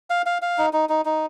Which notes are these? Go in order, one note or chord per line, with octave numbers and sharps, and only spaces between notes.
F5
F5
F5
D#4
D#4
D#4
D#4